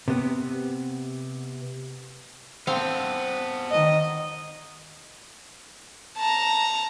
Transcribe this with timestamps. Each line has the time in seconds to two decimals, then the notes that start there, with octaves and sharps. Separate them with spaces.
0.08 C3 B3
2.67 B3 C4 A4 F5
3.71 D#3 D#5
6.17 A5 A#5